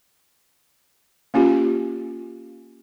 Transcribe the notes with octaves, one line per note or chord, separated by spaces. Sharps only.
A#3 C#4 F4 G4